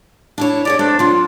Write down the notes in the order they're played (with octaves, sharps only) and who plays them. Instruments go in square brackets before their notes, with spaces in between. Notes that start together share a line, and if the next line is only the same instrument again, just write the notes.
[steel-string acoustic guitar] D4 E4 C#5
[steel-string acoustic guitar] G4 G#4 C#5 [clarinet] D5
[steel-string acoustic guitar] A3 C4 A4 [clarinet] D4
[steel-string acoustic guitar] D3 F#3 [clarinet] F4